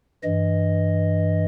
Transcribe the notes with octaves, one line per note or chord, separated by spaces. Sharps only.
G2 E3 D#5